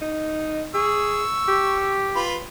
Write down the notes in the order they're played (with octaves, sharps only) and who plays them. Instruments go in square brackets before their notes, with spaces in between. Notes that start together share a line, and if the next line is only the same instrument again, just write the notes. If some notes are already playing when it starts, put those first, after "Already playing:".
[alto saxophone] D#4
[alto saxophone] G#4 [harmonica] C#6 E6
[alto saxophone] G4
[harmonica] F4 B4 B5